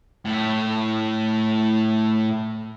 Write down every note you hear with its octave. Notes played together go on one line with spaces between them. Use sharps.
A2 E4